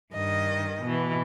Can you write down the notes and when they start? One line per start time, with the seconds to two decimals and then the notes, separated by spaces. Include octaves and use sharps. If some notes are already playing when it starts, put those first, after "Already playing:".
0.13 G2 D#3 D#5
0.83 B2 E3